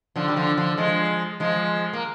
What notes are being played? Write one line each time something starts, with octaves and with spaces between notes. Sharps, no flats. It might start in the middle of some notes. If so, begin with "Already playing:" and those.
D3 F3
G3
D3 F3
D3 F3
F3 G#3
F3 G#3
A#3